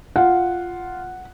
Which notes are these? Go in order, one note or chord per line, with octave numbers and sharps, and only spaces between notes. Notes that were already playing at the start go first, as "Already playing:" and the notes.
F4 F#5